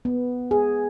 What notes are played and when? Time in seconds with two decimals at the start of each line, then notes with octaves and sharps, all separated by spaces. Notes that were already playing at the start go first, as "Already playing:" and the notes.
0.05 B3
0.51 G#4